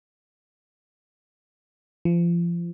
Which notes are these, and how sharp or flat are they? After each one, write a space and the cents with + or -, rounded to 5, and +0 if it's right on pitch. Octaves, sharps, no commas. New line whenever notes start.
F3 -30